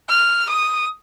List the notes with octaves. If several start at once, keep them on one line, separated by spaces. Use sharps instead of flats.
F6
D#6